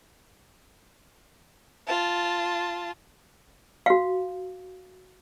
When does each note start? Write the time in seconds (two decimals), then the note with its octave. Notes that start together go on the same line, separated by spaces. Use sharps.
1.87 F4 A5
3.86 F#4 F5